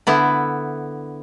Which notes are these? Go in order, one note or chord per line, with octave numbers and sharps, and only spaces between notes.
D3 B3 E4